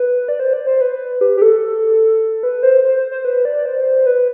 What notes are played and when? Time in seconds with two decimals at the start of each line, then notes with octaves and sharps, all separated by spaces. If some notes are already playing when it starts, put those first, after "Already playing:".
Already playing: B4
0.28 D5
0.40 C5
0.53 D5
0.67 C5
0.81 B4
1.21 G4
1.37 G4
1.42 A4
2.43 B4
2.63 C5
2.84 C5
2.97 C5
3.12 C5
3.25 B4
3.45 D5
3.66 C5
4.06 B4